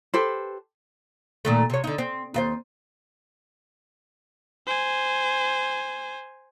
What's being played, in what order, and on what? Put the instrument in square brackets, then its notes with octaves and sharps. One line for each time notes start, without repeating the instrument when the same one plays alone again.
[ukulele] G4 A4 B4 C5
[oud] A#2 D#3 A3
C3 C#5
D3 D#4
C4
D#2 F4 C5
[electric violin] C5 G#5